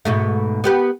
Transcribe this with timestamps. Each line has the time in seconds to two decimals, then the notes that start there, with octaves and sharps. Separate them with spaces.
0.05 G#2 B2 A3
0.64 B3 G4 B4